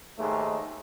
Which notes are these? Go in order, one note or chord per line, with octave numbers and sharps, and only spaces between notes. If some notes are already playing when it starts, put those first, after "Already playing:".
D#2 G#2 G#3 A3